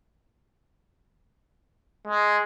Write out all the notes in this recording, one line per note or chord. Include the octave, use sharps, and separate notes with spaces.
G#3